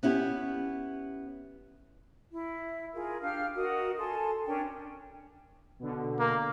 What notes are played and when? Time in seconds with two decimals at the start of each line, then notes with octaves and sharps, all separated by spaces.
0.03 B3 C#4 E4 G4
2.32 E4
2.94 F4 G#4 A#4
3.22 D4 G4 F5 F6
3.56 F#4 A#4 D#5 D#6
3.98 A4 G#5 A5 C6
4.45 C#4 D4 A#4 G5
5.79 B2 D3
6.19 A#3